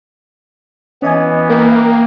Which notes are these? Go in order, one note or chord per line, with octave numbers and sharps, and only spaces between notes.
E3 B3 C#4 D#5 G#5
A#3 A#4 G5